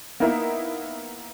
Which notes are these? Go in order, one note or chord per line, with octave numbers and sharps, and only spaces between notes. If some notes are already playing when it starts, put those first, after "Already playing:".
A#3 B3 D#4 E4 A#4 E5